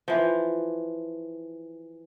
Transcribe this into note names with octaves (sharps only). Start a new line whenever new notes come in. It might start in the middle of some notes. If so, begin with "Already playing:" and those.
E3 F3